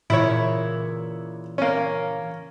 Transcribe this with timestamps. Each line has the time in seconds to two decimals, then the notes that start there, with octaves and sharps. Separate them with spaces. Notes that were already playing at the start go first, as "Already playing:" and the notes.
0.10 A#2 C#3 E3 E4 C#5
1.58 A#3 C#4